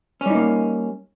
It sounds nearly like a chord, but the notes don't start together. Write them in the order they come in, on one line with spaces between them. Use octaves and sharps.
C#4 G3 D#4 A#3